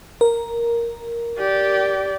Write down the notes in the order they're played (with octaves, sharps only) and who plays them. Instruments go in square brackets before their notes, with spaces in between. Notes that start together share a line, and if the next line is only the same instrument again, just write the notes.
[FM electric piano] A#4
[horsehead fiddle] G4 D5